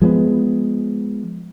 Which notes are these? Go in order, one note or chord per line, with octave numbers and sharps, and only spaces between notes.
F3 G#3 A3 B3